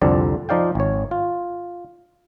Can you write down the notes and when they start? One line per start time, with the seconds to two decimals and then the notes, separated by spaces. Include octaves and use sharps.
0.02 C2 F2 D3 C4 D5
0.49 F3 D#4 D5 F5 G5
0.75 G#1 C#5
1.11 F4